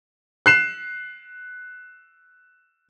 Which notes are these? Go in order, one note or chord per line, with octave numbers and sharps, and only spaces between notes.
F#6 C7 E7